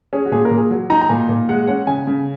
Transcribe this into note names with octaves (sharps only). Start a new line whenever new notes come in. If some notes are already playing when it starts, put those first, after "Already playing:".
C#4 G#4
F#4
A#2 G#4
A#4
A#2
G#4
F#3
D#4 A#5
A#5
A#2 G#5
A#2
G#3 F#5
C#4 F#5
C#3 G#5
C#3